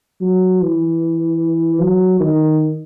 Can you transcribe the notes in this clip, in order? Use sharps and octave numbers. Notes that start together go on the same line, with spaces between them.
F#3
E3
F#3
D#3